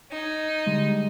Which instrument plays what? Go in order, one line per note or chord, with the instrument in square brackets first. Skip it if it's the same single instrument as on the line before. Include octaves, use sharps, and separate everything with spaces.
[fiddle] D#4 [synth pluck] G#6
[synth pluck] D3 G3 G#3